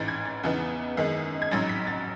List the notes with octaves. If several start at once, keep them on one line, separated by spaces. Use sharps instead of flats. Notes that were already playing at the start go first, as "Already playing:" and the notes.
Already playing: A1 G#2 E3 A6
G#6
A6
E2 C#3 E3 B3 D#4
F#2 D#3 G#3 D#4
G#6
A1 G#2 F#3 A6
B6
A6